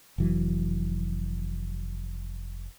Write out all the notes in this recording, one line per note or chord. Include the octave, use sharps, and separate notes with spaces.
F1 E3 F#3